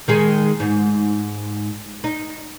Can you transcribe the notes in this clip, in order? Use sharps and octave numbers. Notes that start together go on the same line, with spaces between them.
D#3 G#3 G#4
G#2
D#4